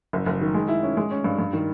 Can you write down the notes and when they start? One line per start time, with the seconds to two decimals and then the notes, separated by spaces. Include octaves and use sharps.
0.13 F#1
0.26 F#1
0.41 D#3
0.54 G#3
0.68 E4
0.83 C#4
0.97 G#3
1.11 C#4
1.24 G2
1.39 G2
1.53 D#3